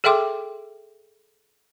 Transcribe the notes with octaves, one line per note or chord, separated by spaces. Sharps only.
G#4 A4 E5 G5 C6 D6